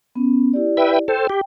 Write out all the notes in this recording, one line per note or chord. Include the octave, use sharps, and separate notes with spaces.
B3 C#4
E4 G4 D5
B4 E5 G5
A4 C5 G5
G4